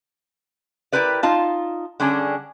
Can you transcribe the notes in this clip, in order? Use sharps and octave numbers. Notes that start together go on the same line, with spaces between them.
E4 G4 A#4 B4 D5
D#4 F4 A5
D3 G3 C#4 D4 G#4